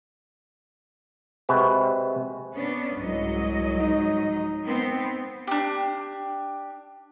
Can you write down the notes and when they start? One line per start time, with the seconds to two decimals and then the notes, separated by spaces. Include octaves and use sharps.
1.49 C3 G#3 F#4 B4
2.54 B3 C#4 D4
2.95 C2 G#2 F#3 D#5
3.79 D#4
4.65 B3 C4
5.47 D4 G4